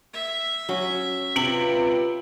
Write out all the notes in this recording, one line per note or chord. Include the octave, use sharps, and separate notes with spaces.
E5
F#3 C#4
C3 F4 B4 D7 F#7